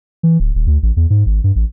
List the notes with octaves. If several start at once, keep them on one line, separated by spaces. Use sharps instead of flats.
E3
D1
D#1
D2
A1
E2
G#2
G#1
G2
A1